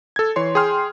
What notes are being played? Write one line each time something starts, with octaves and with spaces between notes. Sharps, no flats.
A4 G#6
E3 C#5 C6
G#4 G5 C6 F6